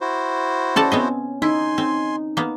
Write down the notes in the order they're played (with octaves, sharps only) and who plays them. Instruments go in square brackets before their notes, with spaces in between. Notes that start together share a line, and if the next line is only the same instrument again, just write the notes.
[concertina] E4 F#4 C5
[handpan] C#4 [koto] A4 D5 A5
[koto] B3 C4 D#5
[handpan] D#4 [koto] E4 [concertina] G#5 C6
[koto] C4
A#3 B3